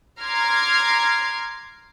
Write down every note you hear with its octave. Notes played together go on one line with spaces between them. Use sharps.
A#5 C6 D6 F6 G#6 C7